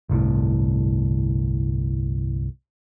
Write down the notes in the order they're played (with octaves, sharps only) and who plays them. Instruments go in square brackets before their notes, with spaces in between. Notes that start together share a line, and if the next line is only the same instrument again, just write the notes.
[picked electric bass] G1 C2 A2